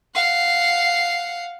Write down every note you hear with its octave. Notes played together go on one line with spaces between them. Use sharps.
F5 F#5